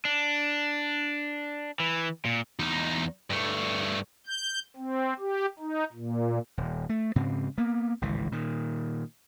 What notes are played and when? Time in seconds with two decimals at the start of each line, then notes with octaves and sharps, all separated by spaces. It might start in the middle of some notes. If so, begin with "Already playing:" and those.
0.05 D4
1.80 E3
2.25 A#2
2.59 E2 D#4
3.30 G2 A3
4.26 G6
4.77 C4
5.19 G4
5.59 D#4
5.92 A#2
6.57 D#1
6.89 A3
7.16 G#2 C#3 C4
7.58 A#3 B3
8.02 G#1 C#2 A2 E3
8.32 A#2 D#3